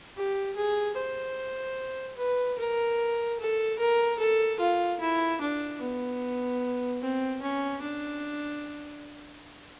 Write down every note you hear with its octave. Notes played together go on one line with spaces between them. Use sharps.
G4
G#4
C5
B4
A#4
A4
A#4
A4
F4
E4
D4
B3
C4
C#4
D4